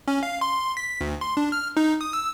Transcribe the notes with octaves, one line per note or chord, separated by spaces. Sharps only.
C#4
F5
C6
B6
D2
C6
D4
F6
D#4
D#6
E6